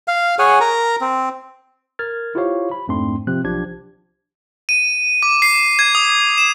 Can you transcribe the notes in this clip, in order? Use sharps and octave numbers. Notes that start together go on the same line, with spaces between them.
F5
G#4 C#5 F#5 G#5
A#4 A#5
C4
A#4 F6 G#6 A6
E4 F4 G4 C5 C#5 F5
B5
F2 G#2 A3 C4 D4 C6
C3 F3 C4 F#6
B1 F3 D4 G4 G#6
D#7
D6
C7
G#6
D#6
E7